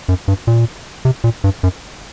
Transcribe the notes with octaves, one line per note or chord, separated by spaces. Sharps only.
F#2
G2
A#2
C3
A#2
G2
F#2